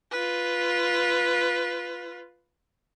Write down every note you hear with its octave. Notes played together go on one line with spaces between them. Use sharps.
F4 B4